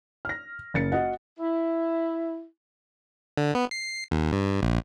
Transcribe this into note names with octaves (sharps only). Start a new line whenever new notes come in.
F6 A#6
F#1 A6 C#7
F#4 D#5 F#5
E4
D3
B3
C7
D#2
G2
A#1